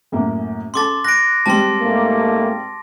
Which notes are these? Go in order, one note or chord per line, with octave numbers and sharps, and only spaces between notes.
F#2 A2 A#3
C#4 A4 A5 C6 D6 A6
F#6 A#6 D7
G3 G#3 C4 A5 C6
G#2 A3 A#3